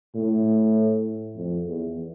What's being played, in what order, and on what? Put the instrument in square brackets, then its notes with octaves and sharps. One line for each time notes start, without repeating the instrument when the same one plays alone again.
[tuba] A2
F2
E2